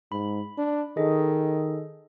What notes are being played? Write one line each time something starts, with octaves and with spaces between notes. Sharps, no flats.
G#2 B5
D4
D#3 G#4 A4 D#5